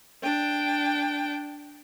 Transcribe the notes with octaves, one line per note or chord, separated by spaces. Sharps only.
D4 G5